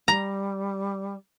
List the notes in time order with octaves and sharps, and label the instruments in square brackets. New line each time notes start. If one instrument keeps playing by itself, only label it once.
[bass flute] G3 [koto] A#5